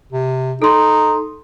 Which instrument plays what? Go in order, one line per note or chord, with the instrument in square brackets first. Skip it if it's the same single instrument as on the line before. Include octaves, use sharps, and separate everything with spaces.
[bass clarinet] C3
[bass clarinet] D#4 [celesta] A4 C6